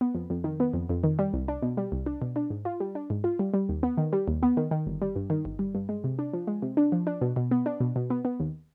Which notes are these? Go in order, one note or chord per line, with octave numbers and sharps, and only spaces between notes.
B3
F2
F2
D#3
B3
F2
F2
D#3
G3
C2
D4
B2
G3
C2
D4
B2
D4
G#2
F4
G3
D4
G#2
F4
G3
G3
D#2
B3
D#3
G3
D#2
B3
D#3
D#3
G1
G3
G2
D#3
G1
G3
G2
G#3
C3
D4
F3
G#3
C3
D4
F3
D4
B2
B2
B3
D4
B2
B2
B3
B3
D#2